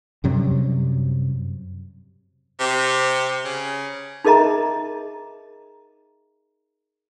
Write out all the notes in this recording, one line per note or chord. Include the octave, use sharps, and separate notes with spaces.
F#2 C3 F#3 G3
C3
C#3
D#4 G#4 A#4 D#5 E5 A#5